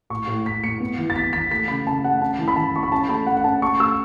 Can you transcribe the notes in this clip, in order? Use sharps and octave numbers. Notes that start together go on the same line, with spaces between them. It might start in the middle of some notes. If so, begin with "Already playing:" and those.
A2 C#6
A2
A2 B6
A2 C#7
B3
E3
A6
B3 B6
E3 B6
A3 B6
C#3 B5
C#3 A5
A3 F#5
C#4 A5
E3
B5
E3 A5
E3 C#6
B5
C#4 A5
A3 B5
A3 F#5
F#5
C#4 A5
A3 C#6
A3 E6